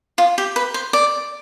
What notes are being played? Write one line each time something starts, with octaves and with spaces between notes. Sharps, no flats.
F4
G4
B4
C5
D5